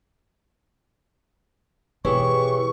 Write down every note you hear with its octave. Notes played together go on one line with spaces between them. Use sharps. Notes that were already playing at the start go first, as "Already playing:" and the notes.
B2 E3 G4 G#4 C#5 C#6